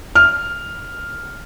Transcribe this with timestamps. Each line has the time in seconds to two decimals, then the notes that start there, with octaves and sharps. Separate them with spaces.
0.15 F6